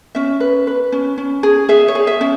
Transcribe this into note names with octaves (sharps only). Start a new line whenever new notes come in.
C#4 E5
B4
B4
C#4
C#4
G#4
G#4 E5
C#5
G#4
E5
C#4